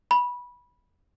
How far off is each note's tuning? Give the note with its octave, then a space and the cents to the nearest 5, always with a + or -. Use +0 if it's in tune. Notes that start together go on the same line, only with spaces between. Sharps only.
B5 -15